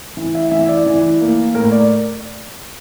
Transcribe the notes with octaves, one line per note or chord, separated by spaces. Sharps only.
E3
E5
E3 E5
D5
E3
A#3
A2 A#4
D5